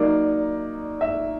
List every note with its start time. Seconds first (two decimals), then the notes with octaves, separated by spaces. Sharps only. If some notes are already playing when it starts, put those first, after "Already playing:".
Already playing: F#3 A#3 D#4 D5
1.01 E5